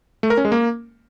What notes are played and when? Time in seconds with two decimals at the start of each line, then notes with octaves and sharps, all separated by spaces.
0.23 A3
0.30 A#4
0.37 C#4
0.45 G#3
0.52 A#3